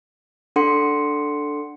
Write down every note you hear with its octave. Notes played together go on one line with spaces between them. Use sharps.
D4 A4 F#5 C6 C#7